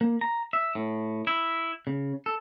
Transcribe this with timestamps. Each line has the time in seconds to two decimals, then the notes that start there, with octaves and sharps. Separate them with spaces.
0.01 A#3
0.21 A#5
0.53 E5
0.75 A2
1.27 E4
1.87 C#3
2.26 A4